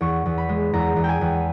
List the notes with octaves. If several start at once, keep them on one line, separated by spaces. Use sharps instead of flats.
E2 C#6
E2
B5
G#3
E2 A#5
E2
G5 G#5
E2